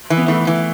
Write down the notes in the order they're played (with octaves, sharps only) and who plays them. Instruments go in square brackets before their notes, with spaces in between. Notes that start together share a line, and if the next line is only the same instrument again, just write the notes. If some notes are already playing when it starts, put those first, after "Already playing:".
[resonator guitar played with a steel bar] E3
[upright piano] B3
[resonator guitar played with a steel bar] E3 [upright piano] A3
[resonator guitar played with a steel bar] E3